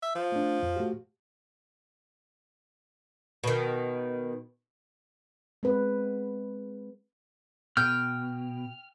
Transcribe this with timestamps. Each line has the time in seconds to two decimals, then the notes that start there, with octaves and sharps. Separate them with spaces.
0.03 E5
0.15 F3
0.32 A3 D4
0.63 F2
0.76 A3 F#4 G4
3.44 B2 D#3
5.63 G#3 C4 B4
7.77 B2 G5 F6